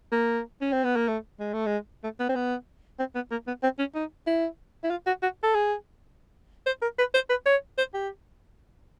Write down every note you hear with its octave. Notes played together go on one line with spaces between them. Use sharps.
A#3
C#4
C4
B3
A#3
A3
G#3
A3
G#3
A3
B3
C4
B3
C4
B3
A#3
B3
C4
C#4
D#4
E4
E4
F4
F#4
F#4
A4
G#4
C5
A#4
B4
C5
B4
C#5
C5
G4